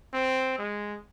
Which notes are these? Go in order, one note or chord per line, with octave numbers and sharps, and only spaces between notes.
C4
G#3